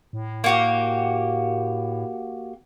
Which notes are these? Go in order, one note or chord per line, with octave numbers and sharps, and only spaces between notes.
A2
A#3 F#4 G4